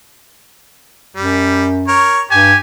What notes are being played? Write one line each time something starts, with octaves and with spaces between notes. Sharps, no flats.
F#2 G3
A#4 C#5
G2 G4 G#5